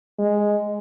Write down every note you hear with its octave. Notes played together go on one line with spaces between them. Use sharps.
G#3